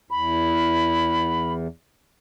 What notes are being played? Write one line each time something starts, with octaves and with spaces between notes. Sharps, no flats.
E2 B5